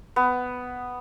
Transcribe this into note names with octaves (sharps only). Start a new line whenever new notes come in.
B3